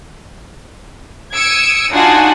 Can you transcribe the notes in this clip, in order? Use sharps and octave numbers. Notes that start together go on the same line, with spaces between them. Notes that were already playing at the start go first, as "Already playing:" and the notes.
D#6 E6 G#6 C#7 D7
D4 D#4 F4 F#4 F#5 G#5